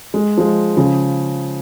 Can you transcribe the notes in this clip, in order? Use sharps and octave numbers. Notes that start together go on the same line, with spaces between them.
G#3
F3 G#3
C#3 F3